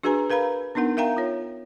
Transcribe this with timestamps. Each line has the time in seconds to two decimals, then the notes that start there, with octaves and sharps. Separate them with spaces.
0.03 D4 F#4 G#4 B4 G#5 A#5
0.30 A#4 B4 F5 A#5 B5
0.75 B3 D4 D#4 A#4 F#5
0.97 A#4 E5 F5 G5 A#5
1.16 F4 C#5